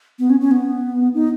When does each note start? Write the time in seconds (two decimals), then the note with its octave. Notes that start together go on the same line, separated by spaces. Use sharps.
0.19 B3
0.30 C#4
0.40 C#4
0.51 B3
1.14 D#4